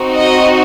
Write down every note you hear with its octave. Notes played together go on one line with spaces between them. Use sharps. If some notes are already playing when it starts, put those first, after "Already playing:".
Already playing: C4 D#4 F#4
D#5